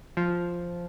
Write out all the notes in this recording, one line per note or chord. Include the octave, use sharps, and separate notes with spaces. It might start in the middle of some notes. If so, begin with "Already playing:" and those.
F3